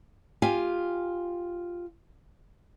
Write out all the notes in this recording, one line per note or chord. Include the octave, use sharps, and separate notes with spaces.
F4 G4 G#5